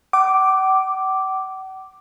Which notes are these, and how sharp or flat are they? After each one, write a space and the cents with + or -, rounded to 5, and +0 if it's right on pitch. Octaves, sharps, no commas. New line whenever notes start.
F#5 +45 D6 +0